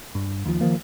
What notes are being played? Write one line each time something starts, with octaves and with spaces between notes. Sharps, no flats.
G2
D#2 F3
D#3 F3 A#3